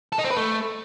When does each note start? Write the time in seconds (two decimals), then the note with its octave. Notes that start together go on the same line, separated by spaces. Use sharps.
0.13 A4
0.19 D#4
0.25 C4
0.31 B4
0.37 A3